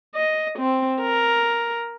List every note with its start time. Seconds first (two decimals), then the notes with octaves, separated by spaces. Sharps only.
0.15 D#5
0.59 C4
1.01 A#4